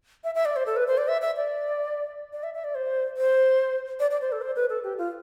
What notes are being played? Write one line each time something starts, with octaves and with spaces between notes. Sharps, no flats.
E5
E5
D5
C5
A4
B4
C5
D5
E5
E5
D5
D5
E5
E5
D5
C5
C5
D5
D5
C5
A4
C5
B4
A4
G4
F4